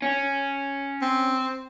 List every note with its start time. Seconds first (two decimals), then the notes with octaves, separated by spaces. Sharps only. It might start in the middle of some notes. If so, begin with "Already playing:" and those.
0.02 C#4
1.02 C4